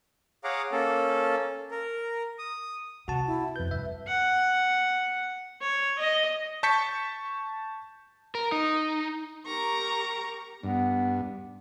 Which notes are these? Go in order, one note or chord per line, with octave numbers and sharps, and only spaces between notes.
G#4 C#5 F5 F#5 A#5 D6
A#3 C#4 A4
A#4
D#6
C3 F#4 F#5 A5
E4
F2 B4 G6
G2 E5
F#5
C#5
D#5
A5 C#6 G6 A6 B6 C#7
A#4
D#4
G4 A#4 A#5 C#6
G2 B3